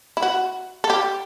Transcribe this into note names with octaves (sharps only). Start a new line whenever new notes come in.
E4
F#4
A4
G4